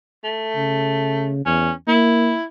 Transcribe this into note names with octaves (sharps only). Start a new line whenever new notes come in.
A3
C#3
E2 C#4
A#3 E4